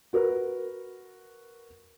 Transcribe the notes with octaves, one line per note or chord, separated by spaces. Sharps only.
F#4 A#4 B4